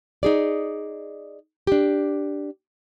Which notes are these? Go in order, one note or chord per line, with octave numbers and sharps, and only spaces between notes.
D#4 G#4 D5
D4 G4